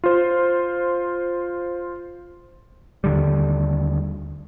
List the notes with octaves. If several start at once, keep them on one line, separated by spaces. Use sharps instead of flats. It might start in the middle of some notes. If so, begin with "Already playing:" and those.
F4 C5
D#2 D3 G3